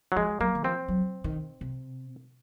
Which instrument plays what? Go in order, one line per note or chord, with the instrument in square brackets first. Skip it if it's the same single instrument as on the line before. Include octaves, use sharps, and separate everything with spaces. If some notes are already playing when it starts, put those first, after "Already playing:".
[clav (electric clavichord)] F#3
[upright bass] F3 [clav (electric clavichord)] G#3
[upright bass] F#3 [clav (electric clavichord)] A#3
[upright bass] D#3
[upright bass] F3 [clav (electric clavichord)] C4
[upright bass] F#3
D#3
C3